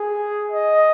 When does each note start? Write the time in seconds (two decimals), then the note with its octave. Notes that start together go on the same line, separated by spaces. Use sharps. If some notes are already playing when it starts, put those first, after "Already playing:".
Already playing: G#4
0.51 D#5